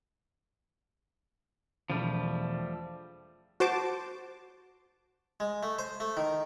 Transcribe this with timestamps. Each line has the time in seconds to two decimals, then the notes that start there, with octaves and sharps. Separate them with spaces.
1.90 E1 F3 G3 A3
3.60 F#4 C5 A5 D6
5.40 G#3
5.63 A3
5.79 C5
6.00 A3
6.17 D#3